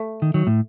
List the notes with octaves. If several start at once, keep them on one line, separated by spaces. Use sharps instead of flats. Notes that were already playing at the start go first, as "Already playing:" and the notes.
Already playing: A3
D#3
D#3 F#3
A2